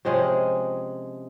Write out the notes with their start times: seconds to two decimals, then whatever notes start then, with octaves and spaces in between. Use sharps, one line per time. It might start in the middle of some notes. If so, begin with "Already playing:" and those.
0.05 C3 F3 G#3 C#4